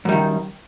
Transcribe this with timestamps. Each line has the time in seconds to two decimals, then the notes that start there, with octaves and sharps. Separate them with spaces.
0.05 F#2
0.09 G3
0.12 D#3